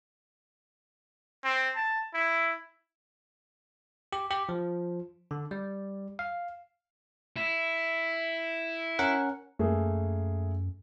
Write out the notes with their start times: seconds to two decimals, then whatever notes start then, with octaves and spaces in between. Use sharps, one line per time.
1.44 C4
1.76 A5
2.14 E4
4.13 G4
4.30 G4
4.49 F3
5.31 D3
5.51 G3
6.19 F5
7.36 E4
8.99 C#4 A#4 F#5
9.59 F#2 A3 A#3 G#4